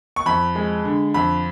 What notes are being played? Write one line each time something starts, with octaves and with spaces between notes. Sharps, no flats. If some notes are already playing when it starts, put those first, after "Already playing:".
C#6
F2 B5
G#3
D3
F2 B5